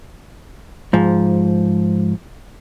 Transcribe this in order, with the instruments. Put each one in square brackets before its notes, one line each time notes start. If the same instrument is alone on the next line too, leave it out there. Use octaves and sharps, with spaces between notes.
[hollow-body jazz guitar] G#2 F3